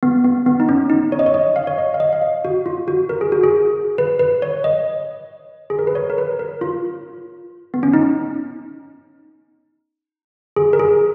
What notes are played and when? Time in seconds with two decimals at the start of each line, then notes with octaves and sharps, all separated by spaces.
0.03 B3
0.24 B3
0.46 B3
0.60 D#4
0.69 C#4
0.90 D#4
1.12 C#5
1.19 D#5
1.26 C#5
1.34 D#5
1.56 F5
1.67 C#5
1.78 D#5
1.94 F5
2.00 D#5
2.13 F5
2.22 D#5
2.45 F#4
2.66 F4
2.88 F#4
3.09 A#4
3.21 G#4
3.32 F#4
3.44 G#4
3.98 B4
4.19 B4
4.42 C#5
4.64 D#5
5.70 G#4
5.79 A#4
5.87 B4
5.95 C#5
6.10 A#4
6.18 B4
6.39 A#4
6.61 F4
7.74 B3
7.83 C#4
7.93 D#4
10.56 G#4
10.73 A#4
10.79 G#4